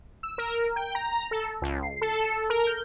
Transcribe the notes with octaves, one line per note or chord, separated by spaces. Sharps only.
E6
A#4
G5
A#5
A4
C#2
C7
A4
A#4
G6